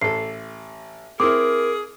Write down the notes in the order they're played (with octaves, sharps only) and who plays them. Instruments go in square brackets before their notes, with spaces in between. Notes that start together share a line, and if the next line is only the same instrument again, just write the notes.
[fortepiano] A1 A4 [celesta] C7
[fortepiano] C4 E4 [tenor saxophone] G#4 [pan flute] A#4 [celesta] D6